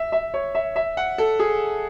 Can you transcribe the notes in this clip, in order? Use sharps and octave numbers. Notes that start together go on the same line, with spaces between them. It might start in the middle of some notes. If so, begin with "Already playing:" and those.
Already playing: E5
E5
C#5
E5
E5
F#5
A4
G#4